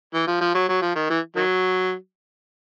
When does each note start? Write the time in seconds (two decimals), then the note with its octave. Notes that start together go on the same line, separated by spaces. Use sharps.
0.14 E3
0.27 F3
0.41 F3
0.55 F#3
0.69 F#3
0.82 F3
0.96 D#3
1.10 E3
1.36 D#3 F#3